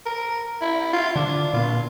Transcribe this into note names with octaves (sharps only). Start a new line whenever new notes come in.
A#4
E4
F4
D3 D4
A#2 B3 F4